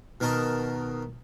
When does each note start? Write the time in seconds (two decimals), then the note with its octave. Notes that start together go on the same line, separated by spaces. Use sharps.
0.20 B2 D#3 A#4 D#5 A5